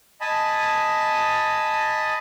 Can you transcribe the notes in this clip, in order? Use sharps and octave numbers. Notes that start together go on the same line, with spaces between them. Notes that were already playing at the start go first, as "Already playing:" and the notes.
D#5 G#5 A5 B5